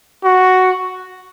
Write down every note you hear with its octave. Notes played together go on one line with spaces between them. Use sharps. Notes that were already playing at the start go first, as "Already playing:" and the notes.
F#4